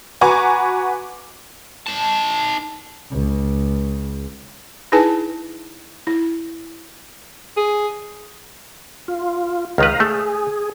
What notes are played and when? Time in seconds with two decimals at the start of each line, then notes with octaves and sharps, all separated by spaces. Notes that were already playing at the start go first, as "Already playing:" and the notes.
0.21 F#4 B4 G#5 A#5 C#6 D6
1.87 D#4 A5
3.11 C#2
4.92 D#4 E4 G#4 B4 G#5 A5
6.07 E4
7.57 G#4
9.08 F4
9.78 C#2 D#3 B4 F5 A#5
10.00 A3 G#4